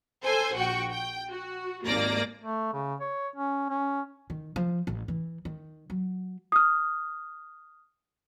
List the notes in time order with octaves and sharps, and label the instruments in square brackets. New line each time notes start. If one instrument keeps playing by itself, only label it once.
[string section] A4 C5 G#5 C6
A#1 F#4 G5 C#6
G5
F#4
G#1 D#2 A#3 D5 A#6
[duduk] A3
C#3
C#5
C#4
C#4
[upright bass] D#3
F3
A1
E3
D#3
F#3
[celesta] D#6 F6